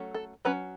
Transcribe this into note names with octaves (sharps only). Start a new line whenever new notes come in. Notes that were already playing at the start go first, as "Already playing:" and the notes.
Already playing: F#3 A3 C#4
A4
F#3 C#4 B4